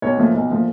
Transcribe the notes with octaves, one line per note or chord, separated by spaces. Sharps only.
B1 C#5
A#2 F3 A3
B1
A#2 F3 A3